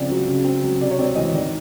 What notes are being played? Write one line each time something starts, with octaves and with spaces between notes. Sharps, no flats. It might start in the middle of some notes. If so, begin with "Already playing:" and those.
Already playing: C#3 F3 C4 D5
F#3
C#3
C4
F#3
C3 D5
C#5
C4 D5
E3 D#5
D#3 D5